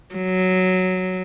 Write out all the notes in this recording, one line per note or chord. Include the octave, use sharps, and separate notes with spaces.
F#3